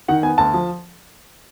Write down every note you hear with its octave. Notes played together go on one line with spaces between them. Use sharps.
D#3 F#5
B3 G#5
D2 A5
F3